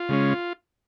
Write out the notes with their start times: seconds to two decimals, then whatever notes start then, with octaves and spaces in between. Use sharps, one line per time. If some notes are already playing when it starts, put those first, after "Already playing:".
Already playing: F4
0.09 C#3 G#3 C#4